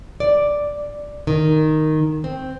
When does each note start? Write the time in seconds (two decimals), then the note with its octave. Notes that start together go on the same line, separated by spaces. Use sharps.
0.20 D5
1.27 D#3
2.24 C4